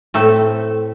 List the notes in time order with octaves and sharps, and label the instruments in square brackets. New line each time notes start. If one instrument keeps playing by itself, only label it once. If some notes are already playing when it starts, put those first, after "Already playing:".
[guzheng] A2 A3 C4 E5